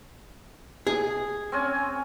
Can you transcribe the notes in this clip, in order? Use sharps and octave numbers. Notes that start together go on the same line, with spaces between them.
G#4
C4 C#4 G#5